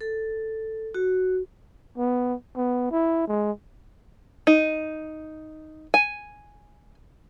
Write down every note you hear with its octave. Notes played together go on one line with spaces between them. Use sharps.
A4
F#4
B3
B3
E4
G#3
D#4
G#5